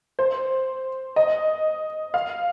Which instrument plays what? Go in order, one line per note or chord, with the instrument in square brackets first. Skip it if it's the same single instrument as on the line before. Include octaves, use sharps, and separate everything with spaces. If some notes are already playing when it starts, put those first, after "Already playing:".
[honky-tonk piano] C5
D#5
F5